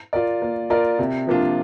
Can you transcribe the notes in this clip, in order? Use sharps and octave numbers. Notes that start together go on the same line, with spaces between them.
F4 A#4 D5
A#3
F4 A#4 D5
C3
F3 A#3 D4 F4